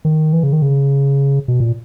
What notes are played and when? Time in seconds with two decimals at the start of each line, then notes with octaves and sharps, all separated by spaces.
0.05 D#3
0.33 E3
0.43 C#3
0.53 D#3
0.62 C#3
1.48 B2
1.60 A#2